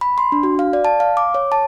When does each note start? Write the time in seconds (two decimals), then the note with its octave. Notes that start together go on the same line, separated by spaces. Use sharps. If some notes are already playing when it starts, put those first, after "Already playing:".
0.01 B5
0.18 C6
0.32 D4
0.43 F#4
0.59 F5
0.73 D5
0.85 A5
1.00 F5
1.17 D6
1.34 C#5
1.52 A5